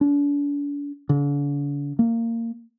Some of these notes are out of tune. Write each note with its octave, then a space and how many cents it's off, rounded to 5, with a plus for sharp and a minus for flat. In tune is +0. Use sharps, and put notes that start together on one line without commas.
D4 -40
D3 -45
A#3 -20